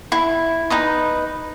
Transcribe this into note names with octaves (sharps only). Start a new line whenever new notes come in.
E4
D#4 B4 D#6